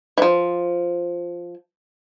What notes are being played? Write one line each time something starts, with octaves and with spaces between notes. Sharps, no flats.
E3 F3